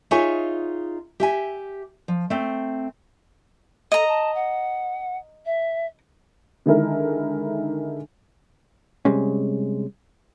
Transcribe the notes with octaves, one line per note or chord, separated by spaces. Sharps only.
D#4 F4 G#4 C#5 E5 G#5
G4 E5 G#5
F3
A3 C4
A4 D#5 A#5
A5
F#5
E5
D3 D#3 G#3 E4 A#4
C3 G3 G#3 C#4